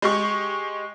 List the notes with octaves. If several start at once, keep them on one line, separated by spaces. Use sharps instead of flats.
G#3 G4 C#6